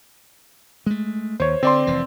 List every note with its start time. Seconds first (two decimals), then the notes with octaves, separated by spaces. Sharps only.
0.86 G#3 A3
1.40 D#2 C5 C#5
1.63 D3 C4 D5 C6
1.87 F1 E3